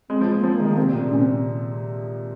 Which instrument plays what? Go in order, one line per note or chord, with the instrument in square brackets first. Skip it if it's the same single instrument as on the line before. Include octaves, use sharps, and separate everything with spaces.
[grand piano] G#3 [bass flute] C4
[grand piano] F3
F3
[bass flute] A#3
[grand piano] F3 [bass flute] C4
[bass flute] A#3
[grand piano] D#3 [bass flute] G#3
[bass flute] A#3
[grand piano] C3 [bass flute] C4
[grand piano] A#2
C3
[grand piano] A#2 [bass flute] C#4
[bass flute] C4